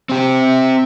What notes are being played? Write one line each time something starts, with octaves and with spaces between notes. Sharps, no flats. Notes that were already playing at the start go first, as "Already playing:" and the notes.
C4 G4